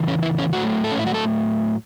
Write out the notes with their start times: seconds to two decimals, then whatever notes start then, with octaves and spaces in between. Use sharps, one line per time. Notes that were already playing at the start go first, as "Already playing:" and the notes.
Already playing: E2 C#3 E3
0.08 C#4
0.22 E4
0.39 C#4
0.53 A2 F#3 A3 F#4
0.84 A4
0.91 C#4
0.99 E4
1.06 F#4
1.14 A4